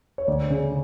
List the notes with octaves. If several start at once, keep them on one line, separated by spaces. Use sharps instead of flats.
C#5
D2 D5
C#3